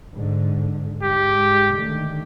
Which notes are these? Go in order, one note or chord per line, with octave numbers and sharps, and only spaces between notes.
G#2 D3
G#2 G#3 G4
D3 D#3 A3